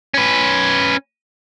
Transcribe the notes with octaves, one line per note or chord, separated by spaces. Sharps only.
C#4 B4